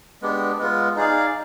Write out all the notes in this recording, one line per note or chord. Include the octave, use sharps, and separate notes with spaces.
G#3 B3 D4 G4
G#3 B3 F4
D#4 G#4 D5 F5